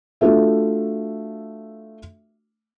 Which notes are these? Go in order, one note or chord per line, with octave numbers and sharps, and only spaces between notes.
A3 D4 F4 F#4 A4 E5